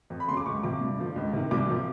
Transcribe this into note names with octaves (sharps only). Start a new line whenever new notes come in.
F2
B5
C#3 F#3 C6
D6
C#2 C#6
C3 F3 D6
G2
D3 F3
C#2
C3 D#3
C2 D6
C3 F3